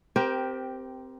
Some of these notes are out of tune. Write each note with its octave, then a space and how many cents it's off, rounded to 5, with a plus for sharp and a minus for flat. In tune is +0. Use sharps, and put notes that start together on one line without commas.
C4 -10 G4 +0 A#4 +25